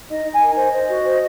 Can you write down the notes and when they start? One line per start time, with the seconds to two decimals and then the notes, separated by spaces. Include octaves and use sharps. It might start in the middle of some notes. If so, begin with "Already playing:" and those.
0.09 D#4 D#5
0.25 D#4
0.33 G#5
0.41 A#4
0.57 C5 D#5
0.72 C5
0.88 F#4
1.05 C5